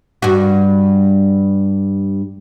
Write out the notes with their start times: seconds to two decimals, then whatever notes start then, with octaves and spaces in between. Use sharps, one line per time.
0.22 G2 F#4